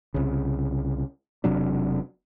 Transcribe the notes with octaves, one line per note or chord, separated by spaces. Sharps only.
C2 C#3
E1 C3 F#3 D4